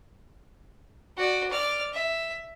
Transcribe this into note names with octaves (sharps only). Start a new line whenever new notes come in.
F#4 D5
D5 F6
E5